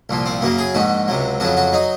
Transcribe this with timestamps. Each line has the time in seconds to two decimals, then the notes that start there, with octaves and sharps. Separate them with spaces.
0.09 C2 A#2 F3
0.26 C4
0.41 F#2 C#3 F#3 A#3
0.58 G#4
0.74 A#1 G#2 D#3 F#4
1.08 C#2 C3 F#3
1.40 F2 C#3 F#3 F#4
1.57 F#4
1.72 F#3 D#4